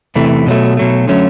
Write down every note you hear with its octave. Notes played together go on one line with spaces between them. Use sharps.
E2 C3 E3 A3
B2 F#3 A3
B2 F#3 A3
D3 F#3 A3 C#4